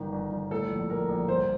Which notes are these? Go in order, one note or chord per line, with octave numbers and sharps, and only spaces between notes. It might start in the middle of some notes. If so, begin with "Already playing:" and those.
Already playing: G1 D#3
G1
G1
A2 A4
A#1
A#1 A#4
A#1
G1 C5